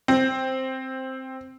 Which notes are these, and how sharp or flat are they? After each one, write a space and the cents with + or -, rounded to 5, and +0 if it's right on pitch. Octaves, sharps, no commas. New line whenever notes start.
C4 +5